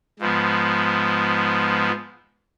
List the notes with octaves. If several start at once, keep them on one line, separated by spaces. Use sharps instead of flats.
G#2 F3 B3